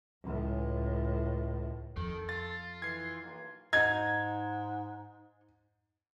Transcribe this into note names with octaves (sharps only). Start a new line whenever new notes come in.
C#2 A2
F2 D#3 A4
F4 A6
E3 G#6 C7
B1 A#3
G#2 D#4 G#6